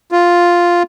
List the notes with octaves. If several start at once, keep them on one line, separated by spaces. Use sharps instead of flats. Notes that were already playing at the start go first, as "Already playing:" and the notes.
F4